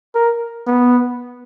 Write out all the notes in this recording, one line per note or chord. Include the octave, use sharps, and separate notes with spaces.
A#4
B3